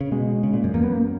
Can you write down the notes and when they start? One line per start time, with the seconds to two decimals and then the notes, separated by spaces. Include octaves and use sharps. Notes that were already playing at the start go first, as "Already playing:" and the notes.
0.01 C#3
0.11 B2 G#3
0.43 C#3
0.53 A#2
0.64 F#2
0.74 E2 A#3
0.83 F#2 B3
0.93 A#3